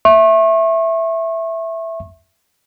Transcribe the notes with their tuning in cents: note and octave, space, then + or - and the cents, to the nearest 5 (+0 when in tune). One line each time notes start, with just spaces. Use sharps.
E5 +0 C#6 -35